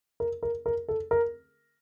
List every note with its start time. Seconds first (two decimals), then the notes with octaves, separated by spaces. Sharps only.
0.20 A#4
0.43 A#4
0.66 A#4
0.88 A4
1.11 A#4